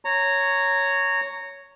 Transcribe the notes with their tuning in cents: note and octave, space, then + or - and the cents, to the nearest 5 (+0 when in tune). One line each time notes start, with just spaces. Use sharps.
C#5 +0 A#5 -15